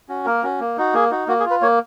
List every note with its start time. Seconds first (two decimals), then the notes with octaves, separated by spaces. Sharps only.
0.09 C#4 F#4
0.26 A#3 A#4
0.43 C#4 F#4
0.60 A#3
0.77 D#4 F#4
0.94 A#3 G#4
1.11 D#4 F#4
1.28 A#3 F#4
1.40 G#4
1.45 F4
1.51 B4
1.62 A#3 C#5